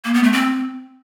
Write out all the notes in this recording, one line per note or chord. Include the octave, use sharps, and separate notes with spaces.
A#3
B3
A3
C4